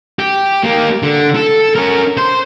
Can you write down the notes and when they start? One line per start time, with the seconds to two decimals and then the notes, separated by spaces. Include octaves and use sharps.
0.19 G4
0.64 A#3 G4
1.03 D3
1.36 A4
1.75 C#4 A#4
2.17 C5